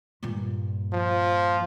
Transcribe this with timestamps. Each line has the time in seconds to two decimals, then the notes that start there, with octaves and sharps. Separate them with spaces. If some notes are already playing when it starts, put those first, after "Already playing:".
0.23 G2 A#2
0.93 F3